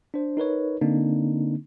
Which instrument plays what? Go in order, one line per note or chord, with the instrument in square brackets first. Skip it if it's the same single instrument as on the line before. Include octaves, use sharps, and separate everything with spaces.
[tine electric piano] D4 C5
D#4 A#4 B4 C#5
D3 A#3 C4 D4 D#4